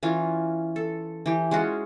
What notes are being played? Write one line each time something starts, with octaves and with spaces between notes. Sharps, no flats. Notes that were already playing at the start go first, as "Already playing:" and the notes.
E3 C#4 F4
A4
E3 G4
G#3 C#4 F4 F#4